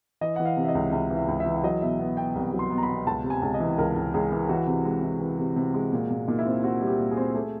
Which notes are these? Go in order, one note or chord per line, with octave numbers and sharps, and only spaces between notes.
E3 D#5
E3 F#5
F5
C3
E5
D#5
C#2
C#2 E5
E3
E5
C#2
E5
E3
E5
F#3 D#5
B2 E5
B3
B3 G5
C2
F#3
C6
B3
A#5
B5
B2
C#2 A5
C3
G#5
C#2
D#5
E3
C#2 A#4
C#2
C#2 G#4
E3
E3 F#4
C3
G#3
E3
E3
C3
C3
G#3
A#2
A#2
A#2 D#4
E4
C4
F4
C4 F#4
G3
G4
A#2
G#4
C4
A3